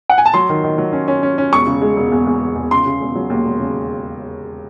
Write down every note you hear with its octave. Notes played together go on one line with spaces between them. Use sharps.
F#5
G#5
A5
F#3 C6
D#3
D#3
F#3
C#4
C#4
C#4
C#4
E1 C#6
C#3
G#3
E1
E2
E2
E2
E2
C#3 C6
C#3
E1
F#3
D#2
E1
C#3